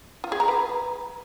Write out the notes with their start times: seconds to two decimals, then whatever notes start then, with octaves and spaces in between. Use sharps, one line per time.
0.24 F4
0.32 G#4
0.40 A#5
0.48 B4